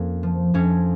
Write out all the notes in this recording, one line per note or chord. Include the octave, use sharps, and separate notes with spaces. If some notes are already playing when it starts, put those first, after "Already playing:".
Already playing: F2 A#3 C#4
F3
F2 C#4